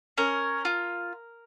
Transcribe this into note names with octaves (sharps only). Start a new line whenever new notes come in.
C#4 A#4
F4